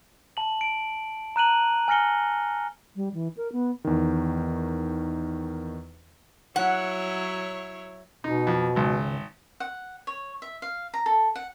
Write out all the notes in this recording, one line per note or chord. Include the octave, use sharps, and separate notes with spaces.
A5 F#7
D7
A#5 F#6 D#7 F#7
G#5 F6 A#6 C#7 G7
G3
E3
A#4
B3
E2 D#3
F#3 E4 C#5 F#5
B2 D#4
F2
G#1 C#2
F#5
C#5
E5
F5
A#5
A4
F#5